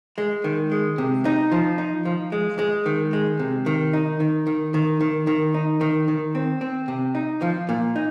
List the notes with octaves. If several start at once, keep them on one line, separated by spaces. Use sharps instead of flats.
G#3
D#3
G#3
C3
D#4
F3
D#4
F3
G#3
G#3
D#3
G#3
C3
D#3
D#4
D#3
D#3
D#3
D#3
D#3
D#4
D#3
D#3
C4
C4
C3
D#4
F3
A#2
D#4